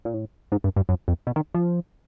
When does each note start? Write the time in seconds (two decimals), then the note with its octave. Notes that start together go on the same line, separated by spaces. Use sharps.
0.05 A#2
0.14 A2
0.52 G#2
0.64 G2
0.76 G2
0.89 F#2
1.08 F2
1.27 B2
1.36 D#3
1.54 F3